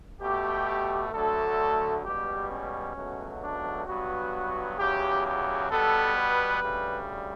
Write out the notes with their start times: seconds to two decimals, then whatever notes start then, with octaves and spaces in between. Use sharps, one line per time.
0.21 B2 A3 G4
1.13 D2 D3 F#3 A3 A4
2.05 C#2 B2 G3 G4
2.51 C#4
2.96 C#2 B2 F#3 A3
3.41 D4
3.87 G2 F#3 B3 F#4
4.79 E2 C#3 F#3 G4
5.25 G4
5.70 B2 G3 B3 A4
6.17 B4
6.62 D2 C#3 G3